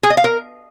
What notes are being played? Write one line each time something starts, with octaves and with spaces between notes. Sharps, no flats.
G#4
D#5
F5
A#4